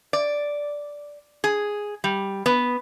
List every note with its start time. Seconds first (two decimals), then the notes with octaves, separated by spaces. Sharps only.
0.13 D5
1.44 G#4
2.04 G3
2.46 B3